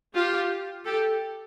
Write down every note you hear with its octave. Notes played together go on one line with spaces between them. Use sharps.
F4 G4
G4 A4